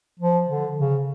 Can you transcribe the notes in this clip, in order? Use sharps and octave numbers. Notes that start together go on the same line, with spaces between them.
F3
D3
C#3